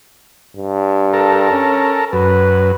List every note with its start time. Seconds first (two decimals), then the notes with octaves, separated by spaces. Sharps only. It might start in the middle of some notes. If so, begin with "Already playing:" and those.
0.56 G2
1.13 A4 A#4
1.52 C#4
2.13 F#2 B4